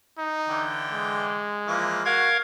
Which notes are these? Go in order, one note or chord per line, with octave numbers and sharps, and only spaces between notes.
D#4
D3 E3 G5
G#3
E3 F3 A#3
F#4 A#4 F5 G#6